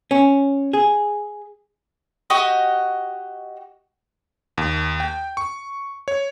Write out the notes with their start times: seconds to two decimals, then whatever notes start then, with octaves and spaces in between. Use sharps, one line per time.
0.11 C#4
0.73 G#4
2.30 F#4 G4 D#5
4.58 D#2
5.00 G5
5.37 C#6
6.08 C#5